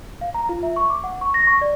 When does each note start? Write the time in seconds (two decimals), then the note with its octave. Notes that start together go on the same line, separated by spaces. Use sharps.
0.21 F5
0.34 A#5
0.49 F4
0.63 E5
0.76 C#6
0.90 D6
1.04 F#5
1.21 C#6
1.34 A#6
1.47 C#6
1.61 D5